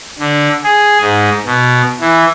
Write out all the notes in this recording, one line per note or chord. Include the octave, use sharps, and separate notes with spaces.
D3
G#4
G#2
B2
E3